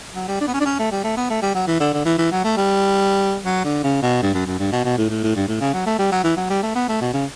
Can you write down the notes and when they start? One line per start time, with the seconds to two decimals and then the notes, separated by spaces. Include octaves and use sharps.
0.15 F#3
0.28 G3
0.41 D4
0.48 B3
0.54 C#4
0.61 D4
0.66 C#4
0.79 A3
0.92 G3
1.04 A3
1.17 B3
1.30 A3
1.42 G3
1.55 F#3
1.68 E3
1.80 D3
1.94 D3
2.06 E3
2.18 E3
2.32 F#3
2.45 A3
2.57 G3
3.45 F#3
3.65 D3
3.84 C#3
4.03 B2
4.22 G2
4.34 F#2
4.46 F#2
4.59 G2
4.72 B2
4.85 B2
4.98 A2
5.10 A2
5.24 A2
5.36 G2
5.48 A2
5.61 C#3
5.74 F#3
5.86 A3
5.99 G3
6.12 F#3
6.24 E3
6.37 F#3
6.50 G3
6.63 A3
6.75 B3
6.89 A3
7.01 B2
7.14 C#3